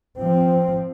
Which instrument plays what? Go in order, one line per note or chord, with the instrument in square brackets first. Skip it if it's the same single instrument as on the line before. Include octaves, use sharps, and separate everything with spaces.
[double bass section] F3 C4